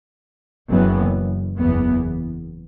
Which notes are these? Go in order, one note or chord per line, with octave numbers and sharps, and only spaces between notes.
F#1 F#2 E3 B3
F#1 E2 E3 B3